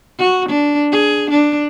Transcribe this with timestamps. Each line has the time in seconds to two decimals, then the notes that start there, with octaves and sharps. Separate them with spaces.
0.18 F#4
0.48 D4
0.91 G#4
1.30 D4